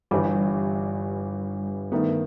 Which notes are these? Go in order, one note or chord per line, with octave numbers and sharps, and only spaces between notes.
G1 G2 E3 G3
G2 D#3 A3 B3